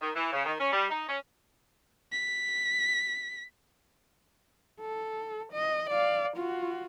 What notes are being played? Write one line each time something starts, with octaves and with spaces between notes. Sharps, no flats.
D#3
E3
C#3
D#3
C#4
G3
D#4
C#4
B6
A4
D#5
D5 F5
F4 F#4